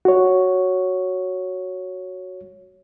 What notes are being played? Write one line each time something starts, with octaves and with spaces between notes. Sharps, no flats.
F#4 C#5